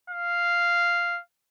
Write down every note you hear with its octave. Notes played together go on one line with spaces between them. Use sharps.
F5